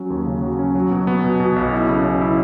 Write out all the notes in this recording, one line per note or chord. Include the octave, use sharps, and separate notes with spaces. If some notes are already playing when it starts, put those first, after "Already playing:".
Already playing: F#3 C#4
D#2
C#3
F#3
C#4
F#3
B2
B3
B2
B2
B1
E4
C#3
C#3
E4